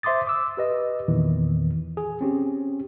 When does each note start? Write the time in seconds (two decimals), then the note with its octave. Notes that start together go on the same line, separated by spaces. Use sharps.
0.03 C5 E5 C6 D6 D#6 A6
0.27 D6 E6
0.57 G4 B4 D#5
1.08 E2 A#2 D#3 E3
1.97 G#4
2.21 C4 C#4 G4